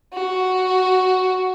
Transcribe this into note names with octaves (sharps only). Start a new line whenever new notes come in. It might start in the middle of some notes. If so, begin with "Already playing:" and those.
F#4